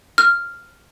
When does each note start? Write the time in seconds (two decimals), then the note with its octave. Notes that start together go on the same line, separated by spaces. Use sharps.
0.18 F6